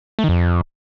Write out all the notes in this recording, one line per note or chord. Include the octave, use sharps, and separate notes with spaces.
A3
D#3
F2